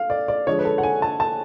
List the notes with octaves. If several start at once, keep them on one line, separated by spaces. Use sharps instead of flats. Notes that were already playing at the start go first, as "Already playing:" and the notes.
Already playing: A3 F5
D5
D5
D3 F3 G#3 C#5
B4
A4
F#5
G#5
A5
A5